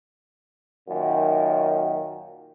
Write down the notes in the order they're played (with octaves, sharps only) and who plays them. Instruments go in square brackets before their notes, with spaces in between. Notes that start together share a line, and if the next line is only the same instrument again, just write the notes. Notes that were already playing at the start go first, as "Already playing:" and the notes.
[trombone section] F#2 A#2 D#3